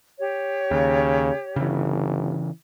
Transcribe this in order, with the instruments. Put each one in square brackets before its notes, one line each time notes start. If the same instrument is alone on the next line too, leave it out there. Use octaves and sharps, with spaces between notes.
[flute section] G4 C#5
[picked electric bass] D#2 [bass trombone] C#3
[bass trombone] G1 [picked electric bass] C#3 E3